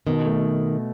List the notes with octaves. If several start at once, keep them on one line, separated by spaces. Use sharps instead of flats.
B2 D#3
A3